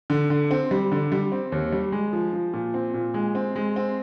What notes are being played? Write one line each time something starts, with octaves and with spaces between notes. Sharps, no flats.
D3
D3
C4
G3
D3
G3
C4
D#2
G3
G#3
F3
F3
A#2
C4
A#2
G#3
C4
G#3
C4